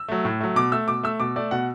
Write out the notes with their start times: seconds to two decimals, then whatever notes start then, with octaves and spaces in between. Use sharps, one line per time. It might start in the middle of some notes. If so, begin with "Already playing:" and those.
Already playing: E6
0.08 F#3 A3
0.25 A2
0.41 F#3 A3
0.56 B2 D6
0.72 A3 E6
0.88 B2 D6
1.04 A3 E6
1.20 B2 D6
1.36 A3 D5
1.51 B2 F#5